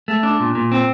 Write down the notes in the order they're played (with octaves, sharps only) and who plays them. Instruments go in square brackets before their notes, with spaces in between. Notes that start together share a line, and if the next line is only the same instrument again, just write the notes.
[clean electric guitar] A3
D4
A#2
A#2
C4